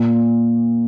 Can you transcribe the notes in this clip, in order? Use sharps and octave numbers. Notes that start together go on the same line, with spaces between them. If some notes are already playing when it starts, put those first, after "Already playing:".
Already playing: A#2